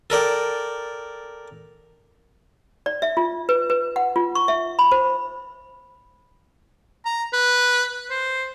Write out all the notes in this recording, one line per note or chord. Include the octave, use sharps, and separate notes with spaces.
A4 A#4 D5 G5
D5
E5
F4
B4
B4
F#5
F4
C#6
E5
B5
C5
A#5
B4
C5